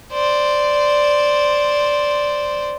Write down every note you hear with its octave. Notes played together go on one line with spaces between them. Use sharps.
C5 D5